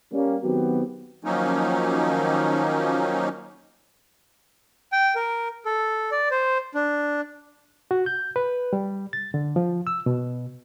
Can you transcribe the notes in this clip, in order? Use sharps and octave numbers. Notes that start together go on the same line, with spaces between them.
G3 A#3 C#4
D#3 F#3 B3 C4 F#4 G4
D#3 F3 F#3 A#3 C#4 D#4
G5
A#4
A4
D5
C5
D4
F#4
G6
B4
G3
A6
D3
F3
E6
B2